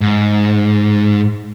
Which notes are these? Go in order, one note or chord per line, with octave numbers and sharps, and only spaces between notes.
G#2